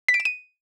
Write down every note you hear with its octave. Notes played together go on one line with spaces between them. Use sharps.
B6
D7
E7
D#7